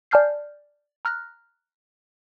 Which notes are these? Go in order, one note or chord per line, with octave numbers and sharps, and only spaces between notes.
D5 G#5 A5 F6 G6 C7
A#5 F6 F#6 A#6